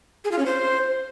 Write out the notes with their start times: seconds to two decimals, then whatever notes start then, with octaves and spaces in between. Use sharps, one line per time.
0.24 G#4
0.32 F4
0.39 C#4
0.46 C5